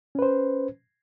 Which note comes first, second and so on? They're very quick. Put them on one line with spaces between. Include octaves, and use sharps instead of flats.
C#4 B4 C5